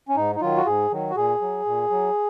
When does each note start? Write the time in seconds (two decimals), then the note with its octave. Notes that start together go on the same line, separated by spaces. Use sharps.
0.09 C#4
0.16 G#2 D#4
0.35 D#4
0.41 D#3 F#3 F4
0.57 F#4
0.66 G#2 G#4
0.92 D#3 F#3
1.10 F#4
1.16 A#2 G#4
1.42 F#3
1.66 A#2
1.90 F#3